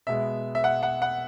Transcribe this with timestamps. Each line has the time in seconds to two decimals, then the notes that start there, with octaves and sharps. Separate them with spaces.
0.07 B2 G#3 B3 E5
0.55 E5
0.64 F#5
0.83 F#5
1.02 F#5